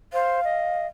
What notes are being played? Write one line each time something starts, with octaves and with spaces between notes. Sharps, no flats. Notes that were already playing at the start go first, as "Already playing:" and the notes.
C5 F5
D#5